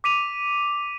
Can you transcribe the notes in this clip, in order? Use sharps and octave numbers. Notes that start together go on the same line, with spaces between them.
D6 B6 D#7 F7